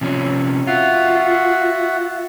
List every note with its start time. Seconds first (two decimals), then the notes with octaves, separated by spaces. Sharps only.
0.01 C3 F3 C#4
0.67 F4 F#4 E5 F#5